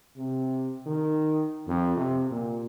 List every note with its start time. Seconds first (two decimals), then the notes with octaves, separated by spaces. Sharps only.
0.17 C3
0.86 D#3
1.67 F2
1.97 C3
2.31 A#2